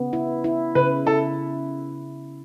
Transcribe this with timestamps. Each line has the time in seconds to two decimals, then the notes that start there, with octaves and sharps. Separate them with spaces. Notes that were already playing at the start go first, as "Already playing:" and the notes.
Already playing: C#3 B3
0.13 E4
0.44 E4
0.75 C#3 B4
1.06 E4 A4